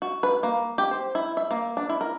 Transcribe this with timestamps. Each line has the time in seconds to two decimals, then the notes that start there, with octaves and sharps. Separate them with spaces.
0.02 F#4
0.23 B4
0.43 A#3
0.78 G4
0.91 C5
1.15 E4
1.37 E5
1.51 A#3
1.77 D4
1.89 E4
2.01 A#4